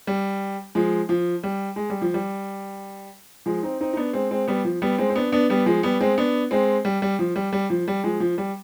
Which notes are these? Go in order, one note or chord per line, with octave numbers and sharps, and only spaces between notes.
G3
F3 G#3
F3
G3
G#3
G3
F3
G3
F3 G#3
C4 D#4
C4 D#4
D#4
B3 D4
G#3 C4
G#3 C4
G3 B3
F3
G3 B3
G#3 C4
C4
B3 D4
B3 D4
G3 B3
F3 G#3
G3 B3
G#3 C4
B3 D4
G#3 C4
G3
G3
F3
G3
G3
F3
G3
F3 G#3
F3
G3